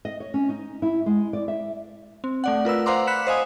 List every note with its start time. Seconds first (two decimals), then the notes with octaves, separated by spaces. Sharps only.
0.05 D#5
0.20 C#5
0.34 C#4
0.49 D#4
0.82 E4
1.06 G#3
1.33 D5
1.48 E5
2.24 C4
2.44 A3 D5 F#5
2.65 F4 A#4 B4 E6
2.86 C5 F5 F#5 A#5 C6 D6
3.07 B5 F#6 B6 C#7 E7
3.27 C5 D#5 F5 G#5 D#6